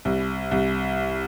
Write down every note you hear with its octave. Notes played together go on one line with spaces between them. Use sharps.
C2
C2